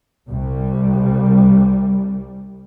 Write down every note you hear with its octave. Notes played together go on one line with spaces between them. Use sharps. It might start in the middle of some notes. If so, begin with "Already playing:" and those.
C2 G3